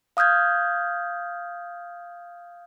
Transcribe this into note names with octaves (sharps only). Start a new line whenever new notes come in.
F5 D#6 F6 G6 G#6